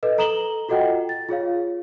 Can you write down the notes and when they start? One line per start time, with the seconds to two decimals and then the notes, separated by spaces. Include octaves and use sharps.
0.03 A4 B4 D#5
0.18 A4 A#5 D#6 E7 F#7 G7
0.69 F4 F#4 A4 D#5 F#5 G5
1.09 A6
1.29 F4 G#4 C#5 F5